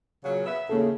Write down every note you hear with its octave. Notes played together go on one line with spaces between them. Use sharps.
A#2 C#3 F#3
B3 E5
D#2 A2 C#3 A#3 A4